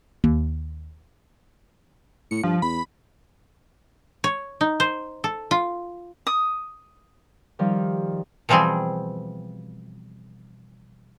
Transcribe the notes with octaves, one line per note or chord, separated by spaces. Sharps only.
D#2
A2 C#7
G2 F3
E2 B5
C#5
D#4
C5
A4
F4
D#6
D#3 F3 G3
B2 E3 F3 G3 C4 G#4